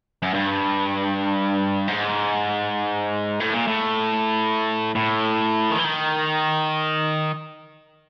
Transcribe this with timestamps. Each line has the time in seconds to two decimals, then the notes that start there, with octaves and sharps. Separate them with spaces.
0.22 F#2
0.34 G2
1.88 G#2
3.40 A2
3.54 A#2
3.68 A2
4.95 A2
5.71 D#3
5.79 E3
5.85 D#3